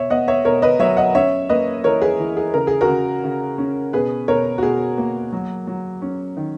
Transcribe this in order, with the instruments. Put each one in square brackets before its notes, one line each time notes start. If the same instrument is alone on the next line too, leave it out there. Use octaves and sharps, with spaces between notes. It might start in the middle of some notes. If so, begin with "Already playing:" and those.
Already playing: [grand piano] B2 C#5 E5
B3 D#5 F#5
C#5 E5
B2 A#4 C#5
B4 D#5
F#3 C#5 E5
D#5 F#5
C#4 C#5 E5
A#3 B4 D#5
E3 A#4 C#5
G#4 B4
E3
G#4
C#3 A#4
G#4
F#4 A#4
C#3
C#3
C#4
B2 G#4 B4
B2 A#4 C#5
F#4
B2 G#4
A#3
F#3
F#3
C#4
D#3